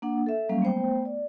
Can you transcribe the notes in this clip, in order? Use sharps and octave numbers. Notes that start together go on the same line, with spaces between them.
A#3 D4 F#5
A4 E5
F#3 G3 A#3 C#4 F5
A3 B3 C5 G5
D5